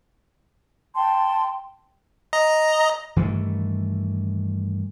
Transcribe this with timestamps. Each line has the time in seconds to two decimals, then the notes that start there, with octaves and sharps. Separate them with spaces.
0.95 G5 A5 C6
2.33 D#5 A#5
3.16 G2 D#3 E3 A3